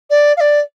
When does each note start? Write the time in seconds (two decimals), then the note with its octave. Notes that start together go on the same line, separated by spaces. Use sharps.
0.10 D5
0.37 F5
0.40 D5